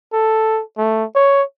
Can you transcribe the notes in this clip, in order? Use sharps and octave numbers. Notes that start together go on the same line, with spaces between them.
A4
A3
C#5